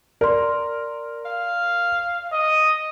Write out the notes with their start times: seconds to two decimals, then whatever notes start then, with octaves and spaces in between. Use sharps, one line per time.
0.21 A#4 D5 C6
1.25 F5
2.33 D#5